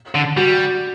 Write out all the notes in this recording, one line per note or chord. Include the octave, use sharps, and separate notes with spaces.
D3
G3 F#4